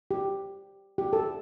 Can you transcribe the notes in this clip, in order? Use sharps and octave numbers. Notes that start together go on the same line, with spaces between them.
G4
G4
A4